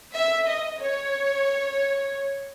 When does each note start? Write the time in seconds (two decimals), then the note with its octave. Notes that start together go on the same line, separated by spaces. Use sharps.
0.13 E5
0.47 D#5
0.79 C#5